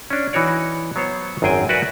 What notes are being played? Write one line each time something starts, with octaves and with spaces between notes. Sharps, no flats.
C#4 D4
E3 D#4 F#4 C#5 D5
F#3 B3 C5 C#5
G#1 F#2 C4 G#4 G5 G#5
F#4 A#4 B4 D5 E5 G#5